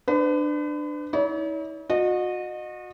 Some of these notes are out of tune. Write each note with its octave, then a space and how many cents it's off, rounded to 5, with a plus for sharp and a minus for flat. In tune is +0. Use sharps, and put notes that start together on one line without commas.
D4 +20 B4 +40
E4 -45 C#5 +45
F#4 -35 D#5 -25